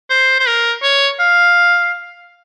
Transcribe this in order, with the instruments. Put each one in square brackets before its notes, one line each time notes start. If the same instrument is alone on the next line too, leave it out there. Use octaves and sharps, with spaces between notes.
[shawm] C5
C5
A#4
C#5
F5